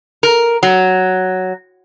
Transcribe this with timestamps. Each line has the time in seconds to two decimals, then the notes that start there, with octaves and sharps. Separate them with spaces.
0.23 A#4
0.63 F#3